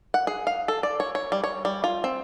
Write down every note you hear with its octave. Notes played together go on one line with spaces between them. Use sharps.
F#5
G#4
F5
A4
D5
C#5
C#5
G3
C#5
G3
F4
C4